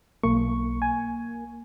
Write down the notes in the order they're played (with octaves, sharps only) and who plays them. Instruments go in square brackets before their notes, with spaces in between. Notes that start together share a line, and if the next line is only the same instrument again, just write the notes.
[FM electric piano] B1 C#6 [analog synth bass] A#3
[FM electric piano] G#5